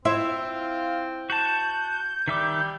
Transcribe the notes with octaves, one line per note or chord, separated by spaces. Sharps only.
C4 E4 F4 C5 E5
F#4 A5 G6
D#3 G3 E5 D6